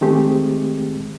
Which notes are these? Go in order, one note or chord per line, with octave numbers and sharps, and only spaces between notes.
D#3 G#3 A3 C4 G4 G#4